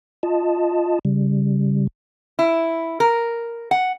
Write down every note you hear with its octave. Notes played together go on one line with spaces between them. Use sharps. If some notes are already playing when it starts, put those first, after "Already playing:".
F4 D#5 A5
C#3 G3
E4
A#4
F#5